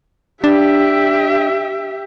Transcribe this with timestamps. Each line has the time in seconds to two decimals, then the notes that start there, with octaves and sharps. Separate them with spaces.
0.44 D4 G4 E5